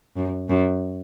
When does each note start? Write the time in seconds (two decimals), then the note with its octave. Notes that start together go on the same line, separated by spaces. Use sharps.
0.16 F#2
0.49 F#2